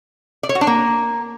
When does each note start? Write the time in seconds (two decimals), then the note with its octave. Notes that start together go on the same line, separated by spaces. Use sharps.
0.43 D5
0.49 C#5
0.55 F#4
0.61 D4
0.67 A#3